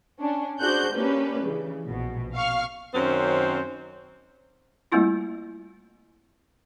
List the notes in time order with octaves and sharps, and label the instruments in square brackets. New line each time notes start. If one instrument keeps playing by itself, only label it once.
[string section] C#4 D4
D4 F#4 G#4 C5 F#6 G6
A#3 C#4 D4 G4 B4
C#3 E3
A#1 B2
F5 C#6 F6
[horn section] F#2 D#3 C4 C#4 C5
[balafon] G3 A3 A#3 C4 E4 F4